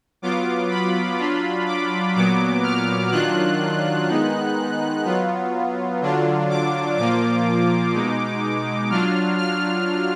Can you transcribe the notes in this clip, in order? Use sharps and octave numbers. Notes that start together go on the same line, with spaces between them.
F#3 B3 F4 D6
B5
F#3 D4 F4
D6
A#2 F#3 B3 D6
F6
D#3 F#3 D4 F4 F#6
D#3 G#3 B3 D#4
F#3 B3 F4
D3 F#3 D4 F4
D6
A#2 F3 A#3 F4 D6
B2 G#3 D#4
F#3 D4 F4 F6
F6